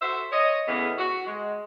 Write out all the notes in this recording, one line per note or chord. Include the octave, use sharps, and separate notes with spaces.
F#4 A4 C5 E5
C#5 D#5
E2 A2 C#3 E3 B3
F#4
G#3